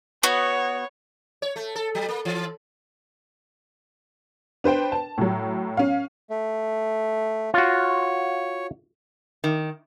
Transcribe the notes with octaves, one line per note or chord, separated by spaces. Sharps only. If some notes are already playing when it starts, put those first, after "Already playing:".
B3 F#4 C#5
C#5
A3
A4
F#3
A#3
E3
D4 B4 C5 G5
A5
A2 F#3
C#4 F5
A3
F4 F#4 C#5
D#3